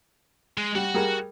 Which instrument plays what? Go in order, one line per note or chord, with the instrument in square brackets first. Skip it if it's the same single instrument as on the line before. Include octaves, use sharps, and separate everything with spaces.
[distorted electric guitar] G#3
[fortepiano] G3 [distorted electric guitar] F#4 F#5
[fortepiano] G3 G#4 A#4